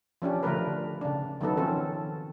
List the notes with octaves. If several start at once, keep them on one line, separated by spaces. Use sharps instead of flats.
F3 C#4 D4 G4
D3 F3 A3 A#4 B4
C#3 D4
D#3 F#3 B3 A4
F3 C4 C#4 A4